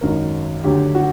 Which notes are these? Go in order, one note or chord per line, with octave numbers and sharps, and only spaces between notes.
G#1 F#2 D#3 F#3 A#4
D2 D3 F#3 G4
F#4